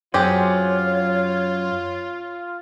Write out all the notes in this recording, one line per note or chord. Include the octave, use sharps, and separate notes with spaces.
F#2 F#3 C4 F4 G4 G#4 C#5